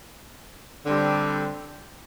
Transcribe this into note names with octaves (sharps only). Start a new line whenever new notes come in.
D3 G3 C4